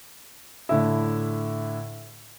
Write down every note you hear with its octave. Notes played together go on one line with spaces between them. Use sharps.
A2 D3 E4